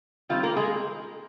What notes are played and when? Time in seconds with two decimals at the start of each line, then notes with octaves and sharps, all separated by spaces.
0.29 D#3 G3 C4 F4 F5
0.43 A#3 A#4
0.57 G#3 G#4